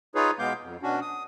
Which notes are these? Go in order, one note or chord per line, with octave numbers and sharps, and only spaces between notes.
D#4 F4 G#4 B4 C#5
B2 G#3 B3 F5 D6 G6
F2
B2 C#4 D4 F#4
D#6